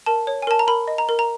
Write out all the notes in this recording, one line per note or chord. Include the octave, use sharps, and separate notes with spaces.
A#4 A5
C#5
G#5
A#4 A5
A#5
A#4 B5
D#5
A#5
A#4
A#5